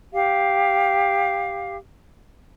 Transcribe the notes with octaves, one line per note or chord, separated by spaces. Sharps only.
G4 F5